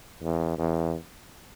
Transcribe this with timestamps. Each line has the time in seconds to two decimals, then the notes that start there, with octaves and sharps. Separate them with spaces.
0.22 E2
0.58 E2